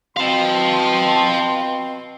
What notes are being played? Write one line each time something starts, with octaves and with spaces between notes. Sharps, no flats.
B2 C4 F5 A5 C6